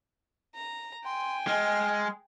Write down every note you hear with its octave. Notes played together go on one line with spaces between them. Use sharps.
A#5
G5 G#5 C6
G#3 F6